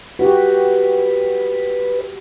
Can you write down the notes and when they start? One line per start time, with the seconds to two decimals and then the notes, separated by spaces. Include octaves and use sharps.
0.19 F#4 G4 B4